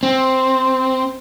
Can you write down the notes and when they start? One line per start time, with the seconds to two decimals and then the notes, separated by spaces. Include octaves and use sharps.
0.03 C4